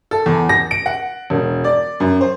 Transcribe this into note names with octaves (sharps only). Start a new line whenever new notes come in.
A4
E2
A#6
D7
F#5
E1
D5
F#2
C5